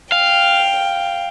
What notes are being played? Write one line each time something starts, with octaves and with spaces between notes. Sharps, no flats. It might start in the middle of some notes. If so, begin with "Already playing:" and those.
F5 G5